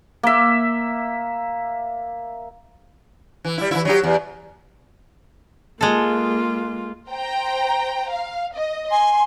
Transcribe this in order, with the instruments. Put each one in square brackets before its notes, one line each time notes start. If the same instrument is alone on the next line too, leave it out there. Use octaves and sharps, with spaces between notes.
[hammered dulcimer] A#3 E5
[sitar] E3
G3 E4
E3 A#3 E4
F#3 D#4 G4
E2
[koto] G#3 A4 [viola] A#3 F4
[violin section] C5 G5 A#5
F5
D#5
[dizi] G#5 [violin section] C6